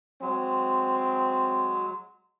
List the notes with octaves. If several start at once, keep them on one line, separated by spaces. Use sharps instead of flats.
F#3 G#3 C4